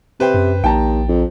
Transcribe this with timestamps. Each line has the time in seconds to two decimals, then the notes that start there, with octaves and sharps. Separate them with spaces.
0.20 C3 B4 C5 G5
0.34 F#2
0.64 A#1 D#2 G5 A5 A#5
1.08 F2